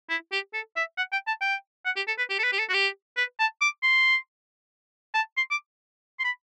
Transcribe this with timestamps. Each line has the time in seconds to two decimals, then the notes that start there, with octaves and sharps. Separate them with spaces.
0.10 E4
0.32 G4
0.53 A4
0.76 E5
0.97 F#5
1.12 G5
1.27 A5
1.41 G5
1.85 F#5
1.96 G4
2.08 A4
2.18 B4
2.30 G4
2.39 A4
2.44 B4
2.53 G4
2.59 A4
2.69 F#4
2.74 G4
3.17 B4
3.39 A5
3.61 D6
3.83 C6
5.14 A5
5.37 C6
5.51 D6
6.19 C6
6.24 B5